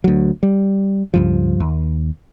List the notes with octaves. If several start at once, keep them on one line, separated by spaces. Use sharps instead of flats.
D2 F#3
G3
C#2 G2 F3
D#2